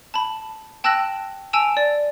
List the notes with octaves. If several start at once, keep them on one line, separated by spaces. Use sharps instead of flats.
A5 B5
G5 A5 E6 F#6 A#6 F#7
G#5 A5 E6 D7 E7 F7
D5